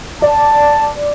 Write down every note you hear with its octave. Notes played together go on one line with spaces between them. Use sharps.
D5 A5